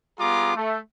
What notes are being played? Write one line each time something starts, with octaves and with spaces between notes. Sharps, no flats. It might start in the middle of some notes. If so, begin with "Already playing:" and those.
G3 B3 F4 G#4 A#5 D6
A3